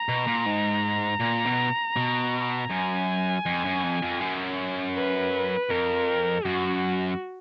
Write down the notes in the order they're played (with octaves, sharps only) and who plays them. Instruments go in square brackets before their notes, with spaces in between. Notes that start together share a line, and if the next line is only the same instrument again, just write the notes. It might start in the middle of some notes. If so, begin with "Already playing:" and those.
Already playing: [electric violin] A#5
[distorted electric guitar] B2
A#2
G#2
A#2
B2
B2
[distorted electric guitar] F#2 [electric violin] G#5
[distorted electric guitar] F2
F#2
F2
F2
F#2
[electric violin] B4
[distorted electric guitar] F2 [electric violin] A#4
[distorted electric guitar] F#2 [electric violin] F#4